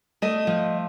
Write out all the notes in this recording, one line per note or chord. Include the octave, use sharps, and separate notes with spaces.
A3 D#5
F3